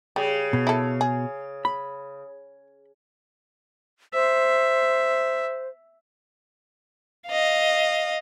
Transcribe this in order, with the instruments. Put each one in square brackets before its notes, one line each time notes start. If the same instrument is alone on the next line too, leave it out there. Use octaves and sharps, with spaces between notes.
[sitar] C#3 [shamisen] G3
[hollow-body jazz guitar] B2
[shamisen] E4 A4
G#4
[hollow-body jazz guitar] B5
[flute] C5 [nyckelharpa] E5
[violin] D#5 F5